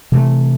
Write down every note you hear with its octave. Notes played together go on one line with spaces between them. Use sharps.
C3 E3 A3